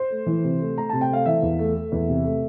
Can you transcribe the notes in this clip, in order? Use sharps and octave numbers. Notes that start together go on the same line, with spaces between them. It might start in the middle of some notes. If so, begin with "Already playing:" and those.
Already playing: C5
A3
E3
C3
A3
A3 A#5
C3 A5
G5
A3 F5
E3 E5
E2
A3
A3
E2
C3
A3